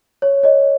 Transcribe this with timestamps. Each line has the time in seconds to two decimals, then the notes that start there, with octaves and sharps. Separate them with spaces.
0.22 C#5
0.43 C#5 D#5